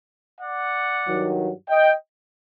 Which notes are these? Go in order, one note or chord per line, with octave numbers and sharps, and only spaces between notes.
D5 F#5
G2 D#3 F#3
D#5 G5